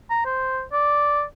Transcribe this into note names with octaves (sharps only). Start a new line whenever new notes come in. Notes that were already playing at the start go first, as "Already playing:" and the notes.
A#5
C5
D5